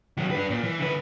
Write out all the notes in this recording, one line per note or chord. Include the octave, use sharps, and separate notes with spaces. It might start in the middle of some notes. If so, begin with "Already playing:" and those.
D#3 F#3
D4 B4
A#2
E3
D3 B4